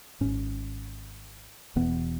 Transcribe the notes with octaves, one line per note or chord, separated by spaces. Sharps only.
G#1 G#2 C#4
E1 E2 B2 B3